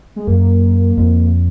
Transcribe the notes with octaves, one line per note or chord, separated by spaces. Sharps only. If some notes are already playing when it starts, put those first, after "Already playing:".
G#3
F#2 A#3
F2